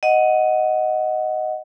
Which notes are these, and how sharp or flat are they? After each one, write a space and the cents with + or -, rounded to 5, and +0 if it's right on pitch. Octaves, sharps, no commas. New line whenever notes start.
D#5 +5 F#5 +0